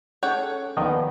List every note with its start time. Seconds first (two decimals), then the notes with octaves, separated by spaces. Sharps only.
0.23 C#4 G#4 A4 C#5 F#5 G5
0.77 D#2 D#3 F3 B3 D5 D#5